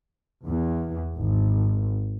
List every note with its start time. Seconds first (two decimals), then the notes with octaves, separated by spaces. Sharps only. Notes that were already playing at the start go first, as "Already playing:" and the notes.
0.45 E2
1.17 G#1